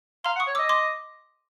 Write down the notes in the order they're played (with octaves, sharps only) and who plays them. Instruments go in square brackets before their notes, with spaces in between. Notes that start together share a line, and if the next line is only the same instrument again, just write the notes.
[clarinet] F5 [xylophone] A#5 C6
[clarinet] F#5
[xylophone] C#6 D#6
[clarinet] C#5
[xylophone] D6 E6
[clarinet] D#5
[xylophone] C6 D6